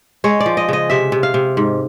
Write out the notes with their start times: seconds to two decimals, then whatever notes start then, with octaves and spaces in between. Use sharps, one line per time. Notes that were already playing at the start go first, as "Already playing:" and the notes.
0.24 G#3 C#5
0.40 D5
0.46 F3
0.57 D#5
0.69 C#3 D#5
0.90 C3 E5
1.12 C3
1.23 F5
1.34 C3
1.57 G#2